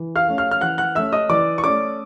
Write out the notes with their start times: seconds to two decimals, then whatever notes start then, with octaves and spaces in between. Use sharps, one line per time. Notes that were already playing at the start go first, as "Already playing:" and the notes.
Already playing: E3
0.16 F5 F6
0.27 A3 C#4
0.38 F5 F6
0.51 F6
0.61 E3 F#5 F#6
0.78 F#5 F#6
0.95 A3 C#4 E5 E6
1.12 D#5 D#6
1.29 E3 D5 D6
1.58 C#6
1.63 A3 C#4 D5 D6